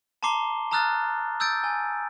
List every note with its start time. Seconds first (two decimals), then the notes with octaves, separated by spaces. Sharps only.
0.23 A5 A#5 C6 D6 C7 G7
0.71 A5 A#5 D#6 F6 F#6 A6
1.40 D#6 E6 G6 A6 D7
1.64 G#5